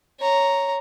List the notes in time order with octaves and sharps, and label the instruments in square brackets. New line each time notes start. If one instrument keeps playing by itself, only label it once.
[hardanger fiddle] C#5 A#5